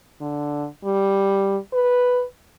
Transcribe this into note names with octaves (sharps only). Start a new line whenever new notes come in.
D3
G3
B4